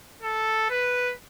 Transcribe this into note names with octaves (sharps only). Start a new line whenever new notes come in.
A4
B4